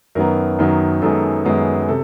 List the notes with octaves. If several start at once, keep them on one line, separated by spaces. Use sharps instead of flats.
F#2 D#3 F#3 B3 A#4
F#2 D#3 F#3 B3
F#2 D#3 G#3 B3 A4
F#2 D#3 G#3 B3
C3 A4